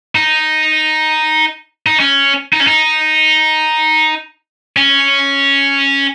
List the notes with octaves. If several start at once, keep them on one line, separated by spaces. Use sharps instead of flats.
D#4
D#4
C#4
D#4
C#4
D#4
C#4